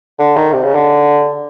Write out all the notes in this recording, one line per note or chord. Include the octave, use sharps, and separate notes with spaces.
D3
D#3
C3
C#3
D3